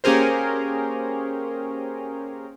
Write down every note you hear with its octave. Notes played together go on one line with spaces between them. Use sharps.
A#3 C#4 G4 G#4 A#4 C5